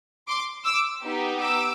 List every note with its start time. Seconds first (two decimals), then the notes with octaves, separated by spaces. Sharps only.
0.28 C6 D6
0.65 D6 E6
1.03 B3 D#4 G4
1.40 D6 E6